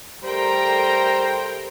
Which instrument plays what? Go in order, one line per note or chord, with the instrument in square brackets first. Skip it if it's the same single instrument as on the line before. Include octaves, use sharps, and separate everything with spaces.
[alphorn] G3 [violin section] A3 A#4 G5 [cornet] C5 [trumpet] A#5